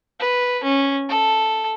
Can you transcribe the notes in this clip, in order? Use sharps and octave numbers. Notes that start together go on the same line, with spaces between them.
B4
C#4
A4